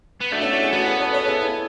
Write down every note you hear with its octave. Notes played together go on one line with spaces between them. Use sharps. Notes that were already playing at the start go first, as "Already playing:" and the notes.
B3
A3 D4 F#4
C#4 E4
D4 F#4
E4 G#4
B3 F#4 A4
G#4 B4
A4 C#5
A4 C#5
E4 G#4
E4 G#4